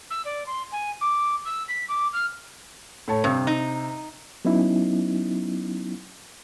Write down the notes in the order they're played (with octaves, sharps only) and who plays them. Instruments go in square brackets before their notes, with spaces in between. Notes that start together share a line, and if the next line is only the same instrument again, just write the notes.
[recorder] E6
D5
C6
G#5
D6
E6
B6
D6
F6
[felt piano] A2 C#5 A5
[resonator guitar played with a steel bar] G2 [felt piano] C3 C4
[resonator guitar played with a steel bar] D#4
[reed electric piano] F#3 B3 C#4 D#4 E4